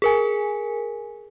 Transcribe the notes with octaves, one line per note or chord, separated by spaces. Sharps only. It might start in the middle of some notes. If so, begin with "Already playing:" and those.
G#4 A#4 G#5